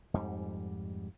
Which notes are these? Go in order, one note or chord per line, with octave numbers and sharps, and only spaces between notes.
F2 G#2 G3